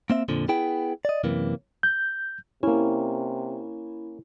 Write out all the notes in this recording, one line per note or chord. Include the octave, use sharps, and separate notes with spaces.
A#3 C4 E5
F2 A#2 D3 F3
B3 E4 G#4 G5
D5 D#5
F#2 C3 E3 A#3
G6
C3 A#3 C#4 E4